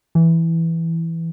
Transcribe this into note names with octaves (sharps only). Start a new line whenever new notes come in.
E3